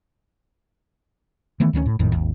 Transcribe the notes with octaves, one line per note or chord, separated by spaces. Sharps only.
D#3 E3 A3 B3
D2 D#3 F3 C#4
A2
G#1 F2 A2 D#3
G#1 D#2